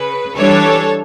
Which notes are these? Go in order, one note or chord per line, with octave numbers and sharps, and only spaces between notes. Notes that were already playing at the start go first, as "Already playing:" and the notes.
Already playing: C#3 B4
E3 G3 D4 A4 C#5